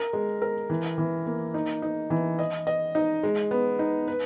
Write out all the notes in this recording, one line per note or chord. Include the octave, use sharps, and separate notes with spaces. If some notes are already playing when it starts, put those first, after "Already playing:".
Already playing: A#4
G#3
A#4
E3
E3
A#3
D#4
D#4
E3
D#5
D#5
D#4
G#3
B3
D#4
B4